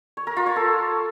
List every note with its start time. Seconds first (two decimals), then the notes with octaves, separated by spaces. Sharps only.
0.17 C#5
0.27 A#4
0.37 F4
0.46 C#5
0.56 A4